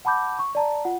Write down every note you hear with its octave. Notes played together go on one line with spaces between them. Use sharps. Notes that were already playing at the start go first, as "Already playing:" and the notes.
F#5 A5 B5 D6 G6
C#6
D5 A5 A#5
F4 F#5